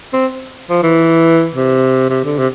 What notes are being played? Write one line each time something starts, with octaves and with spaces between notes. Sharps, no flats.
C4
F3
E3
C3
C3
D3
C3